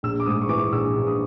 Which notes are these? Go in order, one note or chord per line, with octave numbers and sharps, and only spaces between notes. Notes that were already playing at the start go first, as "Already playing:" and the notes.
A#1 E6
D6
G#2 D#6
C#6
E3 D6
A#1 E6
A#1
D#6